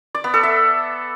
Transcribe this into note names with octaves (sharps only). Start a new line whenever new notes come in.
D5
B3
A4
E5